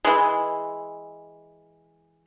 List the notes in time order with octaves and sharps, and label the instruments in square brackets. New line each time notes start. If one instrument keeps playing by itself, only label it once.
[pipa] E3 G#3